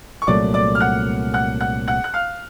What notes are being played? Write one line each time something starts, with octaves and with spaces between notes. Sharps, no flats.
C#6
C2 A#2 F#3 A3 D5 D6
D5 D6
F6
F#5 F#6
F#5 F#6
F#5 F#6
F#5 F#6
F#6
F5 F6